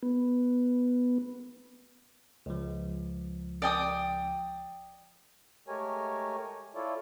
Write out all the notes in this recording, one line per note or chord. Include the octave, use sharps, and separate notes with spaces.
B3
C#2 F3
D5 G5 D#6
G#3 A3 G4 A#4 C#5 G#5
E4 F4 A4 C#5 D5